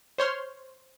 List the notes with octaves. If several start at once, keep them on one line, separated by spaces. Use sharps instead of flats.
C5 C#5 C6 F6